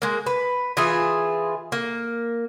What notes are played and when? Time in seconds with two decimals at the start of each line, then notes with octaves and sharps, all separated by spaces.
0.02 G#3 A#3
0.26 B4
0.77 E3 F4 G#4 E5
1.72 A#3